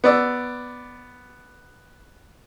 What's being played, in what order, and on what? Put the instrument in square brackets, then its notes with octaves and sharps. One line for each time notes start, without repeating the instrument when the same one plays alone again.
[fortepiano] B3 D5 E6